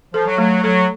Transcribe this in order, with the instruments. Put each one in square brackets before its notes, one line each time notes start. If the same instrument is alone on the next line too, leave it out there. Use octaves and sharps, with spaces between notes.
[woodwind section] F3 [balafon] A4
[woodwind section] F#3
[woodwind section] F#3 [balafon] A3
[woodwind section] F#3 [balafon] A4